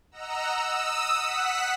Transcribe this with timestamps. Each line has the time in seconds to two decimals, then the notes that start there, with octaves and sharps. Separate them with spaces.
0.11 D#5 F#5 A#5 E6
0.58 D#6 E6
1.14 F#5 B6